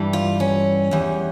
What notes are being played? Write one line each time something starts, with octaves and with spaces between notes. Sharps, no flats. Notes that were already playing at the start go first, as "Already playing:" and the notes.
Already playing: G2 E3 G3
F4
C#4
E2 E3 G3